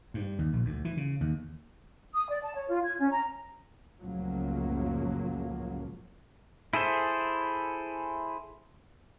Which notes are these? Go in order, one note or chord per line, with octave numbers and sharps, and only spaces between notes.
G2
D#2
A#1
D2
E3
C#3
D#2
D#6
D5
A5
C#5
F4
G#6
C#4
A#5
C#2 F#2 A2 F3 F#3 A#3
E4 G#4 A4 C5